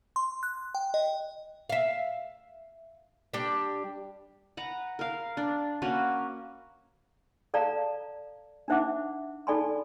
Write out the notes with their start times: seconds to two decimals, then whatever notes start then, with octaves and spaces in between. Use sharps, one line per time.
0.16 C6
0.43 F#6
0.75 G5
0.94 D#5
1.70 E5 F5
3.33 G3 D4 G4
4.57 B4 F#5 A#5
4.99 A#4 F5
5.37 D4
5.82 A#3 C#4 F#4 B4
7.54 A4 D5 F5 A5 A#5
8.68 D4 D#4 C5 E5 F#5 D6
9.47 D#4 A4 D5 G#5 B5 C6